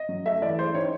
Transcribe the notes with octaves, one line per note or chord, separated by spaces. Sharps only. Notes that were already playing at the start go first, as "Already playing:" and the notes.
Already playing: D#5
F#3
A3 E5
E3 D5
G#3 C5
D#3 C#5